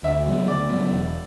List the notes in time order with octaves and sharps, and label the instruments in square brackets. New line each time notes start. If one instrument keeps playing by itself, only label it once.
[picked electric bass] D2 [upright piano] E5
[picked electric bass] C#3 F#3 B3
[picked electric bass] D2 [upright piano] D5
[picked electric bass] C#3 F#3 B3
E1